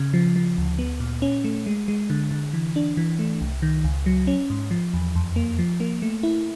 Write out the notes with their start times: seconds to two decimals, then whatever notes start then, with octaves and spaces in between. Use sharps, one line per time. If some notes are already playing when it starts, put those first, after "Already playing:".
Already playing: C#3
0.14 F3
0.36 F3
0.58 D2
0.79 B3
1.00 A#2
1.22 C#4
1.44 A3
1.66 G#3
1.88 G#3
2.10 D3
2.31 D3
2.53 E3
2.76 D4
2.97 E3
3.19 A3
3.41 C2
3.62 D#3
3.84 C#2
4.06 F#3
4.27 C#4
4.50 G#2
4.71 F3
4.94 E2
5.16 F2
5.36 A#3
5.59 F3
5.80 A#3
6.02 A3
6.23 E4